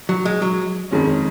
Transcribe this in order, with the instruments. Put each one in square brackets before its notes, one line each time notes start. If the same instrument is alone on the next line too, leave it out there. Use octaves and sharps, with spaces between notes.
[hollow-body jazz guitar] F#3
G#3
F#3
[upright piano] F2 D#3 G#3 C#4